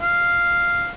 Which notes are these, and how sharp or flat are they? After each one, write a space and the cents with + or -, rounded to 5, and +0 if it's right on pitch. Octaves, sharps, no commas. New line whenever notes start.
F5 -5